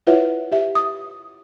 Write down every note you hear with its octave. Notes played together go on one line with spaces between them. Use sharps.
E4 F4 B4 C#5 E5 F#5
G4 E5
D#6